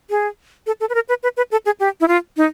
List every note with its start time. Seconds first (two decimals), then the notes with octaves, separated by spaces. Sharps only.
0.10 G#4
0.67 A4
0.80 A4
0.90 B4
0.95 A#4
1.09 B4
1.23 B4
1.37 B4
1.52 A4
1.66 G#4
1.80 G4
2.01 E4
2.08 F4
2.37 D#4